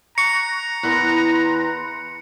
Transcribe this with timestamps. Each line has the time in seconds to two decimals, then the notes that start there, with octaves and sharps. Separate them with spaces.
0.18 A#5 C#6 F#6 C#7
0.83 E2 E3 B5 C6 F#6